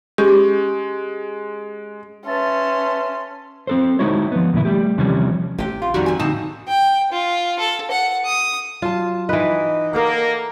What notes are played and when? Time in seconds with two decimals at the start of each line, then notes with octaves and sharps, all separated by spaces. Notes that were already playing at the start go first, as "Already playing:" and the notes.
0.18 G#3 C#4 G4
2.26 C#4 B4 E5 A5 C6
3.67 C4 A4 C5
3.99 G#3 D#4 E4 F#4 C#5
4.32 F3 B3
4.53 D#2 A#2 C#3 E4
4.65 G3 A3 G4
4.98 D#2 C3 E3 F3 G3 C#4
5.58 A1 C3 G4
5.82 F4
5.94 F2 D#3 G3 A#3 C#4 F#4
6.06 F#2 G#5
6.19 A2 D3 C4 D#4 F#4 A5
6.68 G5
7.12 F4
7.59 A4
7.91 F#5
8.26 D#6
8.82 F#3 F4 A5
9.29 E3 D#4 B4
9.93 A#3 A4 A#4 F#5